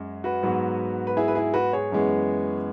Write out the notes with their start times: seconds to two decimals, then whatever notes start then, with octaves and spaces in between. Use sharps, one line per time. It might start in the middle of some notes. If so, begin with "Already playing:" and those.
Already playing: F#2 G#3
0.24 F#4 B4
0.43 G#2 F#3 B3
1.07 B4
1.17 E4 G#4
1.28 B4
1.35 E4 G#4
1.54 F#4 B4
1.73 G#4 C#5
1.92 F#2 E3 G#3 B3